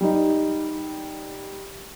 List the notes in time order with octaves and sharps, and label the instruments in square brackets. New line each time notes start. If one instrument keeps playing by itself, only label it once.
[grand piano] G3 D#4